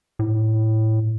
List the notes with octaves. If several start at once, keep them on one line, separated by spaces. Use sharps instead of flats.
A2